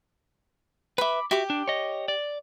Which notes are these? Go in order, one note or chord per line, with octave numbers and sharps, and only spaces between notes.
B4 E5 B5 D6
F#4 G4 E5 D6
D4
C#5 D#5
D5